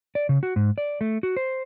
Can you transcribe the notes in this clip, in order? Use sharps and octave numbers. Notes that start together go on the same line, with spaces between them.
D5
C#3
F#4
G#2
D5
A3
F#4
C5